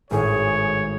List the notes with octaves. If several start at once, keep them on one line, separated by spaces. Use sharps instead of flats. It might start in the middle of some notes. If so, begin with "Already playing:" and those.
G#1 A2 G#4 C#5